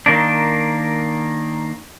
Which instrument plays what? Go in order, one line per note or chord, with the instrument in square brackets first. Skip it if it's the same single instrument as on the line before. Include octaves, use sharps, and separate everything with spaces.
[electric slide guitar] D#3 A#3 D4